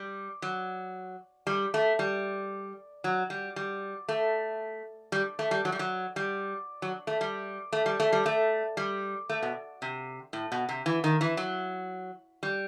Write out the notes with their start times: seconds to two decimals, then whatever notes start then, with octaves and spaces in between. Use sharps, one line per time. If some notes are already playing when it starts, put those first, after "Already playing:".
Already playing: G3
0.42 F#3
1.47 G3
1.74 A3
1.99 G3
3.04 F#3
3.30 G3
3.56 G3
4.08 A3
5.12 G3
5.39 A3
5.51 G3
5.65 F#3
5.72 G3
5.79 F#3
6.16 G3
6.82 F#3
7.07 A3
7.21 G3
7.72 A3
7.86 G3
8.00 A3
8.12 G3
8.26 A3
8.77 G3
9.29 A3
9.42 B2
9.82 C3
10.33 A2
10.52 B2
10.69 C3
10.86 E3
11.04 D#3
11.21 E3
11.37 F#3
12.43 G3